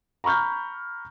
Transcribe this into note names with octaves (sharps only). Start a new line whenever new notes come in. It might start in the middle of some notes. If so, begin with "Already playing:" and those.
A#5 B5 C#6 F6 G6